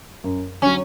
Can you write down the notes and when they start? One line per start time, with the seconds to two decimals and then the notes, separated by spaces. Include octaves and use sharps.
0.24 F#2
0.62 D3 F#3 C#4